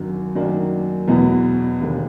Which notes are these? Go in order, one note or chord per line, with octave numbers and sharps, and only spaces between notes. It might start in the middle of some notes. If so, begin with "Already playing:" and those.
Already playing: G#1 F#2 D3 F#3
F#2 D#3 F#3 A#3 D4
E2 B2 F#3 B3
E1 D#2 D3